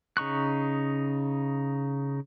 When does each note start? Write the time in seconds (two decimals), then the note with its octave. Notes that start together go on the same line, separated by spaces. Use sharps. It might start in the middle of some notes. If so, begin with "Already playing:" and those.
0.17 C#3 D#4 C#6 F#6